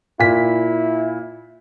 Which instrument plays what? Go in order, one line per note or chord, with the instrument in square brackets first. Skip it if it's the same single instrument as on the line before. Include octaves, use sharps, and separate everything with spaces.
[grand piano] A#2 B6 [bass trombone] E4